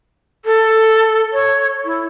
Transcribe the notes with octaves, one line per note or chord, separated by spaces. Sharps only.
A4
C#5
E4